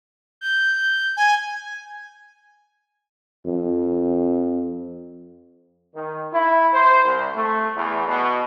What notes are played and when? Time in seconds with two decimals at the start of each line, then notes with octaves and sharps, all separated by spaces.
0.41 G6
1.17 G#5 G#6
3.46 F2
5.95 D#3
6.33 E4
6.73 C5
7.05 C2
7.36 A3
7.76 E2
8.08 B2